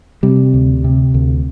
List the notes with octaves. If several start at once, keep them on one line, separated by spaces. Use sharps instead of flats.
C3 G3
D2
C3
D2